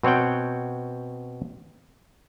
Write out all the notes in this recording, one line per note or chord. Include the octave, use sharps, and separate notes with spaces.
B2 C4 C#5 F#5 G5